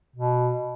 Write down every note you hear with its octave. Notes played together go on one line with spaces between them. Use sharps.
B2